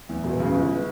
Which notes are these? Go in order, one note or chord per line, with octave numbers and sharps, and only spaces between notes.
E2
E1
C#3
G1